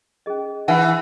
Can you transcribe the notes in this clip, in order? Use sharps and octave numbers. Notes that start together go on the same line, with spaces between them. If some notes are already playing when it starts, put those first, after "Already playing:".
C#4 G#4 D#5
E3 E4 B4 F#5